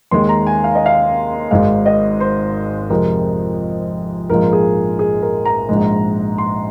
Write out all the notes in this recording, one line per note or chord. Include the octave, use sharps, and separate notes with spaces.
D#2 D#3 G#3 C6
A#5
G#5
F5
D#5
F5
G#1 G#2 G#3 F5
D#5
C5
F2 C3 G#3 A#4
A#1 G#2 F3 G#3 A#4
G#4
G#4
A#4
A#5
A#1 G#2 G#3
C6